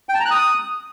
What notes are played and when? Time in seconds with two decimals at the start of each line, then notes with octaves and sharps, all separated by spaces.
0.09 G5
0.14 A5
0.20 A#5
0.25 F#6
0.31 D#6